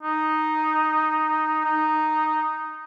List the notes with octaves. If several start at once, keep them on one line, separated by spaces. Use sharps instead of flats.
D#4
D#4